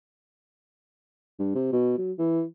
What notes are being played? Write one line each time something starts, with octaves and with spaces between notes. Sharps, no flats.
G2
C3
B2
F#3
E3